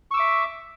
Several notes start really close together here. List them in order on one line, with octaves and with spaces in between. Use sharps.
C#6 E6 D6 E5